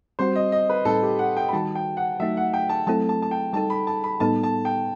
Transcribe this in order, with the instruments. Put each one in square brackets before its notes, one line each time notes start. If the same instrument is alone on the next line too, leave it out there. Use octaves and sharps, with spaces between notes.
[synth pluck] G3 C4 F#4 [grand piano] C5
[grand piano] D#5
D#5
B4
[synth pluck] A2 G3 C4 D#4 [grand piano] A4
[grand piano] G4
F#5
G5
B5
[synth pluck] D#3 G3 D#4 F#4 [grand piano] A5
[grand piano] G5
F#5
[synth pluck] F#3 A3 D#4 F#4 [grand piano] E5
[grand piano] F#5
G5
A5
[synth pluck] F#3 A3 C4 E4 A4 [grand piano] A5
[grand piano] A5
A5
G5
[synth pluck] G3 D#4 A4 [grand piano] A5
[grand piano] B5
A5
B5
[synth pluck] A2 G3 B3 D#4 A4 [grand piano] A5
[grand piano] A5
G5